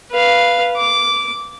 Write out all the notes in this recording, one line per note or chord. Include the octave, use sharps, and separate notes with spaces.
B4 F5
D6